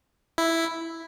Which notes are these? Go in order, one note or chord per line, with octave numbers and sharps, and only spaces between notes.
E4